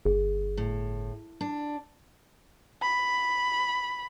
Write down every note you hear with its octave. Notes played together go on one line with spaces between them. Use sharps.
G1 G#4
A2
D4
B5